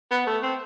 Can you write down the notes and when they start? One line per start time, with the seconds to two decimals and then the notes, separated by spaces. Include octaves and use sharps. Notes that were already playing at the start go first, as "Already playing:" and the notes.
0.11 B3
0.27 A3
0.43 C4